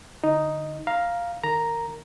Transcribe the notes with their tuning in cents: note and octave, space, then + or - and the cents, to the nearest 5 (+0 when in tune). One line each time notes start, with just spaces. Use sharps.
D3 +20 D#4 +0
F5 +0 A#5 +10
D#3 +0 A#4 -15 A#5 +0